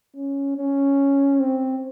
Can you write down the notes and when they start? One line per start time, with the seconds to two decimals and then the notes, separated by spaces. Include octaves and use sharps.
0.16 C#4
0.57 C#4
1.40 C4